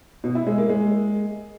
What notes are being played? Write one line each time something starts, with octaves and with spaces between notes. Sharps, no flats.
B2
E4
G#3
A#3
G#3